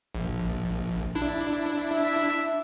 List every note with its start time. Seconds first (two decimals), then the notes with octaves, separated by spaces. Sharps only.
0.15 A#1
1.15 D4 E4
1.91 E5